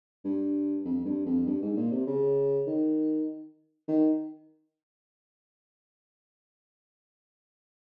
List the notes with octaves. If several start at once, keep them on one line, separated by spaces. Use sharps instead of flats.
G2
F2
G2
F2
G2
G#2
A#2
C3
C#3
D#3
D#3